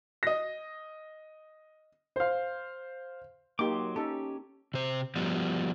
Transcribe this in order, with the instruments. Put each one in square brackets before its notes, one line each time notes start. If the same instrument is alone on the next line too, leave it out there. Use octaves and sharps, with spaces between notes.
[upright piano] D#5 A#6
[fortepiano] C5 F5
[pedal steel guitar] F#3 C6 D6 [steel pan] A#3 D#4 G4
[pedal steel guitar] C#4 G4 [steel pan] D#4 A4
[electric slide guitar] C3 C5
F3 G3 B3